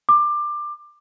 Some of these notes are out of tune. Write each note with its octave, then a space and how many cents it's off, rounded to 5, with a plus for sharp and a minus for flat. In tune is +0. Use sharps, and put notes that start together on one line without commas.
D6 +20